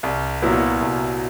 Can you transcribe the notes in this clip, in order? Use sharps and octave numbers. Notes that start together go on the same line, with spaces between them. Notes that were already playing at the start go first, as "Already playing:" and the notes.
C2
A#2 F#3 B3 E4
C2